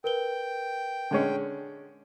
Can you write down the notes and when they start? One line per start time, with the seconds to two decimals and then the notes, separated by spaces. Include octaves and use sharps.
0.04 A#4 B4 G5 G7
1.11 D3 G#3 C#4